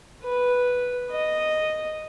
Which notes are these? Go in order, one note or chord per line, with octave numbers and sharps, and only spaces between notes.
B4
D#5